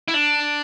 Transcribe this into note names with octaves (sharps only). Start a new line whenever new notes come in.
E4
D4